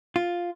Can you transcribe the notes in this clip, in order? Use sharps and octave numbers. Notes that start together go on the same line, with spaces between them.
F4